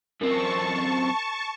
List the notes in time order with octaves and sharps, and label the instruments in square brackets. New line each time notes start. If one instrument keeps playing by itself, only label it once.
[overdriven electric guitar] F#2 C4 [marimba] A#4 [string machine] A5 C#6